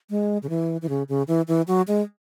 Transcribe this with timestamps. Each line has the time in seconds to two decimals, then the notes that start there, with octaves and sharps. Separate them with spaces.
0.10 G#3
0.43 C#3
0.49 E3
0.82 E3
0.89 C#3
1.09 C#3
1.28 E3
1.48 E3
1.68 F#3
1.88 G#3